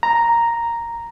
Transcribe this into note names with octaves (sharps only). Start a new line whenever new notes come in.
A#5